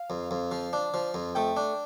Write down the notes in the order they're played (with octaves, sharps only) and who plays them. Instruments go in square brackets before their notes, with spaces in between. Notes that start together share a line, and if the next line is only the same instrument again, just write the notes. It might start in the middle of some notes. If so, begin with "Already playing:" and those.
Already playing: [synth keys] F5
[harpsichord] F2
F2
F3
D4
F3
F2
[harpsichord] A3 [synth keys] G5
[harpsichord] D4